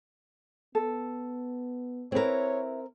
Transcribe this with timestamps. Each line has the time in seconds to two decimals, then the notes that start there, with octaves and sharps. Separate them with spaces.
0.75 B3 A4
2.12 C4 E4 A#4 B4 C#5